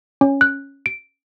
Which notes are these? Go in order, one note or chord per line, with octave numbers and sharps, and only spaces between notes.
C#4
F#6
D7